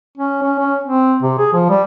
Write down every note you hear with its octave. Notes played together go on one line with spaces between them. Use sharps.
C#4
C#4
C#4
C4
C3
G#4
F3
G3